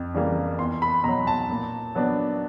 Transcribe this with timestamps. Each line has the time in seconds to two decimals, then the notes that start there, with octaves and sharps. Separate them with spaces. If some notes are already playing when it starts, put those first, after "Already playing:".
Already playing: F2
0.14 C#3 E3 G3 A#3
0.59 E2 C6
0.82 B5
1.03 B2 F#3 A#5
1.27 A5
1.50 A#2
1.95 F#3 B3 D4